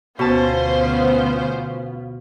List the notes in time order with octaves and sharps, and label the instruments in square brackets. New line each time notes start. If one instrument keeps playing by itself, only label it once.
[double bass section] D2 [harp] B2 A5 [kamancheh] B3 F4 [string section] C#4 C5